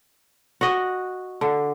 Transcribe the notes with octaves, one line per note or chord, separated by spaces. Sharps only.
F#4 D#5
D3